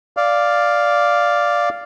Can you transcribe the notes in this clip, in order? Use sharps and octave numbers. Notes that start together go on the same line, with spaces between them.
D5 F5